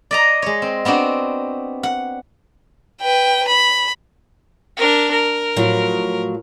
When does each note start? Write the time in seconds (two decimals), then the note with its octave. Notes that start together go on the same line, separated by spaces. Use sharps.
0.11 D5 D#5 A#5
0.42 G#3 C#5
0.62 C4
0.85 B3 C4 D4 F#4
1.83 F#5
3.01 B4 G5
3.48 B5
4.77 D4 A#4
5.11 A#4
5.56 A2 F3 F#3